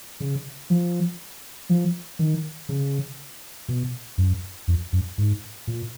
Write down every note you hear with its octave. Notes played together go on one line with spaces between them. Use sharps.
C#3
F3
F3
D#3
C#3
B2
F#2
F2
F#2
G#2
A#2